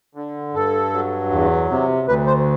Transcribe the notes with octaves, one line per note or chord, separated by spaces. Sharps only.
D3
G2 A4
F#3
E2
C3
D2 B4
C5